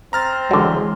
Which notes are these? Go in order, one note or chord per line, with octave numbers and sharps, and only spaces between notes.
C4 A#5 F6 A6
D3 E3 F#3 G#3